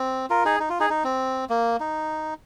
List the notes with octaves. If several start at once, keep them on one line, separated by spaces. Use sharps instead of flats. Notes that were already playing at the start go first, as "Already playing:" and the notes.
Already playing: C4
F4 A#4
D#4 G#4
D#4
F4
D#4 G#4
D#4
C4
A#3
D#4